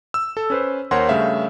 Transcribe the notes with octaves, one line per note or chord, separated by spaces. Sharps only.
E6
A4
C#4 B4 C5
D#2 A#4 C5 C#5 F#5 C6
G2 C#3 A3 E5 F5